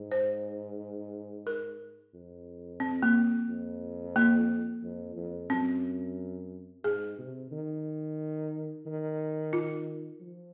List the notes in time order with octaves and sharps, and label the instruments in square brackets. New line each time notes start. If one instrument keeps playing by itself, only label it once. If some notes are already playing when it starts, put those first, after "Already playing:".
Already playing: [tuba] G#2
[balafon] C5
A#4
[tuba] F2
[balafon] C4
A#3
[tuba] F2
[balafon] A#3
[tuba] F2
F2
[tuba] F#2 [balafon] C4
[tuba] G#2 [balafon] G#4
[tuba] C3
D#3
D#3
[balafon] F4
[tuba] F3